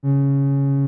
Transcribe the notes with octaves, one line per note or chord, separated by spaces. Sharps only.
C#3